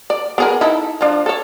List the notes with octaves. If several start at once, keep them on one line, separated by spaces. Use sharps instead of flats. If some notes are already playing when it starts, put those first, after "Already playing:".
D5
B3 G#4 A#4
D#4 E4 A4
F3 D4
A4 C#5